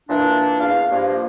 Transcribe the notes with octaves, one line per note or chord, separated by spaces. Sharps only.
A#2 E3 D4
E2 F5
G2 F3 A#3